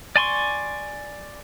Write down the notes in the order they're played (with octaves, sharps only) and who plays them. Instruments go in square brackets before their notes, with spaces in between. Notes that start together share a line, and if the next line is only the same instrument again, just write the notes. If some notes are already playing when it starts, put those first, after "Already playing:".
[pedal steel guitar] D5 G#5 C6 C#6